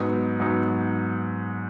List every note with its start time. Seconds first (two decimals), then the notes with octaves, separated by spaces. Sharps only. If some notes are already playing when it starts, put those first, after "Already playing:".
Already playing: G#2 F#3 B3 D#4
0.40 G#2 F#3 B3 D#4